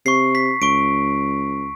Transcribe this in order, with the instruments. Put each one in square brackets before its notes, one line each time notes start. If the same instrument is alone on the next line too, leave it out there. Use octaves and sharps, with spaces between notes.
[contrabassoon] C3 [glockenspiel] C#6 C7
[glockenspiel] B6
[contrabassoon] C#2 [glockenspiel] C#6 D7